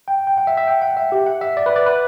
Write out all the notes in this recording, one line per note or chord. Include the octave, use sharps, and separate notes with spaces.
G5
G5
F#5
E5
E5
G5
F#5
E5
G4
F#5
E5
D5
B4
D5
B4